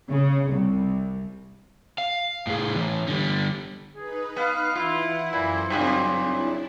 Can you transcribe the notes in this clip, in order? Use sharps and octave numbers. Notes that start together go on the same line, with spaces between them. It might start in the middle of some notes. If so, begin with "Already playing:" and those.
C#3
C2
F5
A2 G#4
E3 A3
D3 G3
D#4 G#4 B4
B3 F5
E3 E4 F4 F#5
F#2 A#2 A4 C5
G2 A#2 C#3 F#3 C4 D#4
D4 E4